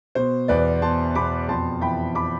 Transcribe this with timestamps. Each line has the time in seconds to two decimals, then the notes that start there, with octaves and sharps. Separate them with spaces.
0.15 B2 C5
0.48 E2 B4 D5
0.82 B2 A5 C6
1.15 B2 B5 D6
1.49 F2 A5 C6
1.81 E3 G5 B5
2.15 B5 D6